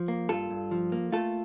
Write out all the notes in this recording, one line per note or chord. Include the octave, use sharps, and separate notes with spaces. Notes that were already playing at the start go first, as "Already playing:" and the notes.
Already playing: F3
A#3
G2 F4 A4
G2
F3
A#3
A3 F4 A4